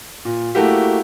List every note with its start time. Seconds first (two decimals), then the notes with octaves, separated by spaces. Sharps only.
0.25 A#2
0.55 A3 A#3 E4 F#4 G4